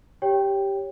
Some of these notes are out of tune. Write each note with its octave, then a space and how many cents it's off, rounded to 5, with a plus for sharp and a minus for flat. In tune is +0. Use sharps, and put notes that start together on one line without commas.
G4 +0 C#5 +0 G5 +0